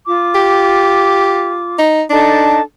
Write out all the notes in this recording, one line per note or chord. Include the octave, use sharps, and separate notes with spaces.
F4 D6
G4
D#4
D4 D#4 A4 A5